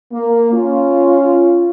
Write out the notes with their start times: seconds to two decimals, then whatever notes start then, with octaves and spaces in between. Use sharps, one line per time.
0.12 A#3
0.53 C#4 F4